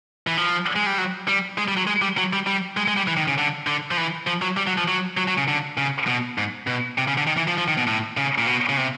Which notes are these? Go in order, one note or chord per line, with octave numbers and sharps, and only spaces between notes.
E3
F3
G#3
G3
F#3
G3
G#3
G3
F#3
G#3
G3
F#3
G3
G3
G#3
G#3
G3
E3
D#3
C#3
D3
D3
F3
E3
F3
F#3
G3
F#3
F3
F#3
F#3
F#3
C#3
D3
C#3
B2
G#2
B2
C3
C#3
D3
D#3
E3
F3
F3
D#3
B2
A2
C#3
A#2
B2
C#3
C3